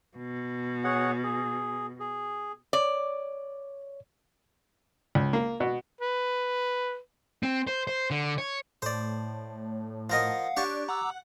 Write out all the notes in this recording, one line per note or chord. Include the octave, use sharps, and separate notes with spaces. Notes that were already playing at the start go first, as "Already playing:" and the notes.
B2
G#4 C#5 F#5
G#4
G#4
C#5 D5
C#2
A#3
B2
B4
C4
C5
C5
D3
C#5
A2 C5 D5
F3 A#4 D#5 F5 F#5
D4 G4 C#5 A5
F#5 A#5 D6 E6